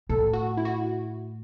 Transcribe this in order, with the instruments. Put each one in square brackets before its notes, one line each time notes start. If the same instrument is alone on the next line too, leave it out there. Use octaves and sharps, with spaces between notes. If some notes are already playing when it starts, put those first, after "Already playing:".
[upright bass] A2 [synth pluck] A4
[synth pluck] F#4
E4
F#4